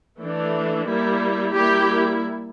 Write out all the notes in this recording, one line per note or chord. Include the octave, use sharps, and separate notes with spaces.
E3 A3 D4
G3 A#3 E4
G3 A#3 E4 G4